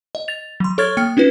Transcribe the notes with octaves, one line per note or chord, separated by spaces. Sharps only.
D#5
A6 F7
F#3 C6
A4 C#5 C#6 F6 G#6 A6
A#3 G5 F6 C#7
C#4 D#4 F4 B4